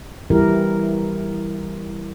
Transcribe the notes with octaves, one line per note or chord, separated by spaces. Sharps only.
E3 G3 E4 G4 A#4